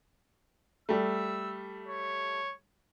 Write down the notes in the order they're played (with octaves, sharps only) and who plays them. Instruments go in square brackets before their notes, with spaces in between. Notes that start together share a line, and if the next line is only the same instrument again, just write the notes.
[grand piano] G3 A3 [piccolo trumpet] E6
[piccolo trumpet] C#5